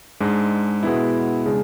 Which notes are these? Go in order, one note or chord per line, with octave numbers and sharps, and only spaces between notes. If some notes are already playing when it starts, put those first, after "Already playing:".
G#2 G#3 D4
B2 G#3 B3 E4
C#3 G#3 D4